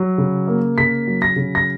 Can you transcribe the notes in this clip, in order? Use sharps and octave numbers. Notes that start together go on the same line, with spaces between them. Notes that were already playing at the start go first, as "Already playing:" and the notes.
Already playing: F#3
C#3
A#3
C#3 B6
F#3
A#6
C#3
A#6